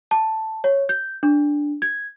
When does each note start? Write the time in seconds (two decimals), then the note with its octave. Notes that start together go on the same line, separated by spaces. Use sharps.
0.11 A5
0.64 C#5
0.89 G6
1.23 D4
1.82 G#6